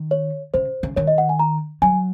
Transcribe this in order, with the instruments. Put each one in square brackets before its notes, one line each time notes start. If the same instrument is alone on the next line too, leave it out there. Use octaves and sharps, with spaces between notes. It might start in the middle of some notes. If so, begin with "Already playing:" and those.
Already playing: [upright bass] D#3
[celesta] C#5
[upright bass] C#3 [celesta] C5
[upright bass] C#3
[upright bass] D#3 [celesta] C#5
[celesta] D#5
F#5
G#5
A#5
[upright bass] F#3 [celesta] G#5